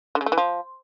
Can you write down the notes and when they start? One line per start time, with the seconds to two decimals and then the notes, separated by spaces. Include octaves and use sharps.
0.15 D3
0.21 C#3
0.26 A3
0.32 E3
0.38 F3